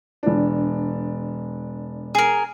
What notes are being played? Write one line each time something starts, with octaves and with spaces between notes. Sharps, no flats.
E1 D4
G#4 A#4